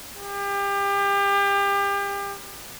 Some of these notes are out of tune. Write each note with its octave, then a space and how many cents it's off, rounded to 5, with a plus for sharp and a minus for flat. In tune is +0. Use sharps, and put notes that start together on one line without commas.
G4 +30